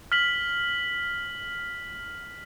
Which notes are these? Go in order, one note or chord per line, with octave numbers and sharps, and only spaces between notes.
F6 B6 F#7